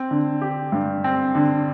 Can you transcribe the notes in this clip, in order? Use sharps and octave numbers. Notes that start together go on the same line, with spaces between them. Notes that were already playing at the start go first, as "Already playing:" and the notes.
Already playing: C4
D3
G4
G2
C4
D3